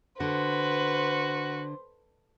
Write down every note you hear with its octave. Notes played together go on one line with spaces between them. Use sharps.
D3 F#4 B4 C5